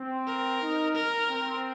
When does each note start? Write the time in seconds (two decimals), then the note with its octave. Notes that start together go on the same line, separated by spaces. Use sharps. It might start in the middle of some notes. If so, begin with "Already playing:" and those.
Already playing: C4
0.27 A#4
0.62 D#4
0.95 A#4
1.29 C4